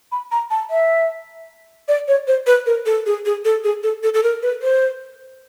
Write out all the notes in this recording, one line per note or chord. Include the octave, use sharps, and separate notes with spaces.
B5
A#5
A5
E5
D5
C#5
C5
B4
A#4
A4
G#4
G#4
A4
G#4
A4
A4
A4
A#4
B4
C5